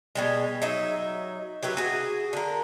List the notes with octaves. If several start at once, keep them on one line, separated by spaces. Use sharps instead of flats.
B2 G3 G#3
F#3 D#4 E5
F#3 G4 B4 E5
F#4 G#4
D3 A#4